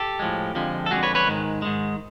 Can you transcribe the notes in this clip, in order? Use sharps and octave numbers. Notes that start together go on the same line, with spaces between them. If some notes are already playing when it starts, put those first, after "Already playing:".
Already playing: G4 A4
A2 F3 G#3
F2 D3 F3 G#3
A4
F2 D3 F3 G#3 F#4 G#4
B4 C#5
B4 C#5
G#2 D#3 G#3
G#2 D#3 G#3